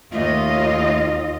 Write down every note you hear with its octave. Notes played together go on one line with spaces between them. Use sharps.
D#2 A3 F4 D#5